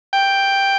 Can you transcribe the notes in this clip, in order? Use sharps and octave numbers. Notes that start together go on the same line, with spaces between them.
G5